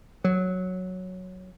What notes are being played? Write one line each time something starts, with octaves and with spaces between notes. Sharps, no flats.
F#3